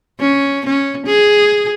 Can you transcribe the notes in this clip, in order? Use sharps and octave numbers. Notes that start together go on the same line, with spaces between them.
C#4
C#4
G#4